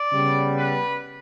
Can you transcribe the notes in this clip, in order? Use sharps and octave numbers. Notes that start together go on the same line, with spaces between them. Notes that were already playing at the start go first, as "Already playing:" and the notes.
Already playing: D5
C#3 G3 B3
B4